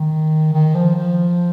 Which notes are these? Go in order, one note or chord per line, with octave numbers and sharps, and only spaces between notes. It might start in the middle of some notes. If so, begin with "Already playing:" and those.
Already playing: D#3
D#3
F3
F3